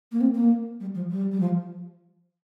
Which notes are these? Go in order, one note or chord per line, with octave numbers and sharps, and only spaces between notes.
A#3
C4
A#3
G3
F3
G3
G3
F3